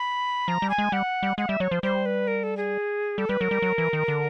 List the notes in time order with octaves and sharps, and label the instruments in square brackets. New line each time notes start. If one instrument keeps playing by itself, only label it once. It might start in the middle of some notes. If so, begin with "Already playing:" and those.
Already playing: [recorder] B5
[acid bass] F3 [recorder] A#5
[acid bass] G3
[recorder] G#5
[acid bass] G#3
[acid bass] G3 [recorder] F#5
[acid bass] G3
[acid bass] G#3 [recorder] F#5
[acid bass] G3 [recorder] E5
[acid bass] F#3 [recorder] C#5
[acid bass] F3 [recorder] C5
[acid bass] G3 [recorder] C5
[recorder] B4
A#4
A4
G#4
[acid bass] G3 [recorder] A4
[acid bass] G3 [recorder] B4
[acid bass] F#3 [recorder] A#4
[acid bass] G3
F#3
E3
D#3
D3